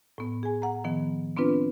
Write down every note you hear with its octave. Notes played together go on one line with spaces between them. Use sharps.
A2 B3
G#4 G#5
F#5 A#5
D#3 F3 B3
B3 C4 D4 F4 B4